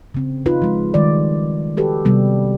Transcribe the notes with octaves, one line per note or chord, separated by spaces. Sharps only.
C#3 C4
D#4 F4 B4
F3 G#3
D#3 G3 G#3 D5
F#4 G4 A4 B4
C3 G3 B3